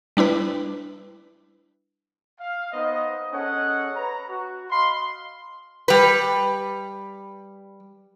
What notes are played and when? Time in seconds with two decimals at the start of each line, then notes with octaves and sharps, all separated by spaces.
0.17 G3 D4 E4 B4
2.39 F5
2.72 B3 D#4 C5 D#5
3.32 C#4 G#4 A4 C#5 D#5 F#5
3.96 B4 A#5
4.28 F#4
4.70 D#5 F5 B5 C6
5.88 G3 B4